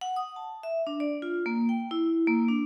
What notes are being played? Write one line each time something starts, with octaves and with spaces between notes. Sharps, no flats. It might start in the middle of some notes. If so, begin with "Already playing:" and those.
F#5
D#6
A5
E5
D4
D5
F4
A#3
G5
E4
A#3
D4